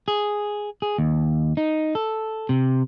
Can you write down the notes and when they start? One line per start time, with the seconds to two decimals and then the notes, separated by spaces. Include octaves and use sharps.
0.08 G#4
0.82 G#4
0.98 D#2
1.57 D#4
1.95 A4
2.49 C3